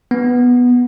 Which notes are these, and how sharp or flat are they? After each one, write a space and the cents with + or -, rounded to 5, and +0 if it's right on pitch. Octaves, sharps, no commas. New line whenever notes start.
B3 -5